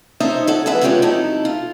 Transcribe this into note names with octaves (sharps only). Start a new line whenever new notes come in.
D#4 A4 C5 C#5 D#5 E5
C#4 A4 F#5
E2 G#3 B4 E5 F#5
D3 F3 G#3 B3 G4 C#5
C3 F#3 D#4 E4 A4
F4